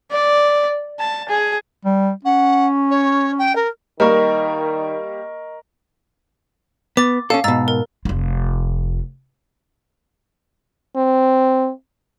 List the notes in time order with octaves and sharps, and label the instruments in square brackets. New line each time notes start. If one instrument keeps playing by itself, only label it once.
[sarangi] D5
A5
G#4
[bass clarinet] G3
[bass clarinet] C#4 [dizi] F#5
[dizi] C#5
G5
A#4
[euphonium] D#3 [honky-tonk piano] G3 A#3 [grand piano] A#4 [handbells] D#5 C#6
[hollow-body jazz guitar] B3 [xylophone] D6 A6
[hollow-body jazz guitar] C#4 D#4 A4 [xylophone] F5
[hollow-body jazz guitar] G#2 B2 [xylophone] A#5 E6 A6
[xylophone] A#4
[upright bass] F1 F4
[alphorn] C4